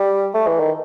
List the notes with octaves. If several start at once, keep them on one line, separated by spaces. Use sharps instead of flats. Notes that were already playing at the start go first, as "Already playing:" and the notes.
Already playing: G3
A3
E3
D#3